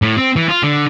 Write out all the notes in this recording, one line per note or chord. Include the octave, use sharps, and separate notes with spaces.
A2
C4
E3
F4
D3